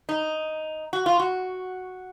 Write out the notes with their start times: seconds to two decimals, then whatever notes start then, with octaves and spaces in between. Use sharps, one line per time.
0.09 D#4
0.93 F#4
1.06 F4
1.20 F#4